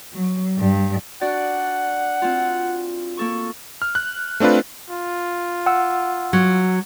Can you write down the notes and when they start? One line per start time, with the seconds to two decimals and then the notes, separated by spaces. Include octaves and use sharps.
0.14 F#3
0.58 G2
1.21 D4 F#4 D5 F#5
2.22 C4 F4
3.17 A#3 A4 C#6
3.82 F6
3.95 F#6
4.40 A3 C4 D4 F4 B4
4.90 F4
5.66 F#5 E6
6.33 F#3